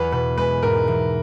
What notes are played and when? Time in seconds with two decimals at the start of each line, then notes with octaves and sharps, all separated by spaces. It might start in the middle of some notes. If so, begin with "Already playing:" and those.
Already playing: E2 B4
0.12 B2 B4
0.38 G#3 B4
0.63 G#2 A#4
0.88 E3